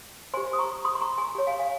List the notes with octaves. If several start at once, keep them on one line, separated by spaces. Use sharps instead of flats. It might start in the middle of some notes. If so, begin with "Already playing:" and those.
G4 C5 G#5 C6
D#6
A#5 C#6
C6 D#6
C6
A#5 C#6
G#5 C6
G4 C#5
F5 G#5
F5 G#5